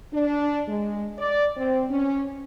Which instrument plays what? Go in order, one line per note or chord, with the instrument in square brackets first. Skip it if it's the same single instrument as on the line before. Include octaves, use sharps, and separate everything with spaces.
[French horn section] D4
G#3
D5
C4
C#4